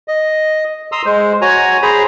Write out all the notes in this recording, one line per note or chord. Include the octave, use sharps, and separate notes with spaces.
D#5
A#5 C6 D#6 E6
G#3 C5
F#4 C#5 G#5 A#5
G#4 C5 A#5 B5